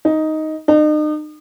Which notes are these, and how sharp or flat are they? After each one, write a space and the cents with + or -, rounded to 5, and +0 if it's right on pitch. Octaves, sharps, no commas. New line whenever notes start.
D#4 +5
D#4 -40